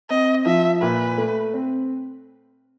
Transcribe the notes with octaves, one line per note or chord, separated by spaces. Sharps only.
C4 D#5
F3 E5
A#2 B4
A3
C4